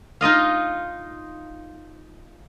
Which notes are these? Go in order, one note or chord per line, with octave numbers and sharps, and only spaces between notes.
D#4 F4 D#5 F5